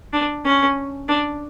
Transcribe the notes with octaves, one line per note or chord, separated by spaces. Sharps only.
D4
C#4
D4